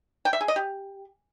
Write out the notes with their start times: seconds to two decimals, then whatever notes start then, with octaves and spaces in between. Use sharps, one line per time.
0.25 G5
0.33 E5
0.41 G#4
0.48 D#5
0.56 G4